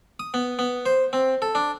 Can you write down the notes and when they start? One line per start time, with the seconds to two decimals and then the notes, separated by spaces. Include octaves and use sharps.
0.20 D#6
0.34 B3
0.59 B3
0.86 C5
1.13 C4
1.42 A4
1.55 D4